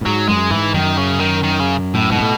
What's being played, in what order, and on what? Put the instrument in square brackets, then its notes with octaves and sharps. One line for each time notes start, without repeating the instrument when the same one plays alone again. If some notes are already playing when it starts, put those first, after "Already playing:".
[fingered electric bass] A2
[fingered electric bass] G#2 [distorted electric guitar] F#3
[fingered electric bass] F#2 [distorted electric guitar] G#3
[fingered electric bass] G#2 [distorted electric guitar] E3
[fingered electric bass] F#2 [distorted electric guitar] D#3
[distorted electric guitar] C#3
D#3
D#3
C#3
A2
[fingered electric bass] G#2 [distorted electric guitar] B2
[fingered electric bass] A2